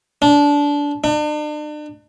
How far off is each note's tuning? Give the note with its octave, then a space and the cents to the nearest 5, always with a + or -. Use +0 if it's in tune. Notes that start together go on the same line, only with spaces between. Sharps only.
D4 -20
D4 +40